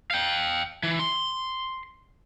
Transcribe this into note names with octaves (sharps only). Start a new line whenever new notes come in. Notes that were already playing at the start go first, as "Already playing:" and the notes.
F5 G5
E3
C6